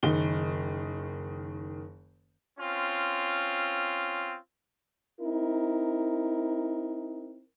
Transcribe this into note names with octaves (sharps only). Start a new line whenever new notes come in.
F#1 D#3 G7
C4 C#4 F4
C4 D#4 E4 A#4